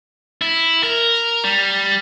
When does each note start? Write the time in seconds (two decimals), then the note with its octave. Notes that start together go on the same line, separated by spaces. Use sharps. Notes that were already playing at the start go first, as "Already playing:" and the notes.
0.42 E4
0.83 A#4
1.44 G3